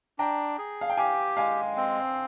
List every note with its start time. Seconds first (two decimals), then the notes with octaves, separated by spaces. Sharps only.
0.19 D4 G5 A#5
0.58 G#4
0.81 F5
0.89 G5
0.97 G4 F5 G#5
1.37 G#3 F5 G#5
1.77 C4